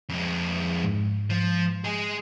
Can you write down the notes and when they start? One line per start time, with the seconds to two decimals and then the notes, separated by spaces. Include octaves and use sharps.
0.10 F2 G#3
0.84 G#2
1.30 F3
1.84 G#3 G#4